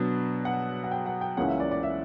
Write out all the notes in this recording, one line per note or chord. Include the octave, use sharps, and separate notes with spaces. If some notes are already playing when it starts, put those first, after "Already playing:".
Already playing: B2 F#3 B3 D4
F#5
F#5
G5
F#5
G5
C#2 C#3 E3 A#3 C#4 F#5
E5
D5
D5
E5